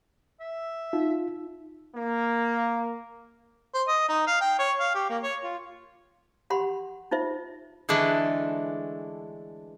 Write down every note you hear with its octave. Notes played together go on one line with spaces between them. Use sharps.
E5
D#4 F4
A#3
C5
D#5
D#4
F5
G5
C#5
F5
G4
A#3
C#5
F4
G4 F#5 B5 C6
D#4 F4 C5 E5
D3 E3 G#3 A3 D4 B4